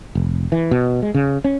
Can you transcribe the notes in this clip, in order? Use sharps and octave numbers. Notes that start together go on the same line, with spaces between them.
F1
E3
B2
G#3
C#3
C#4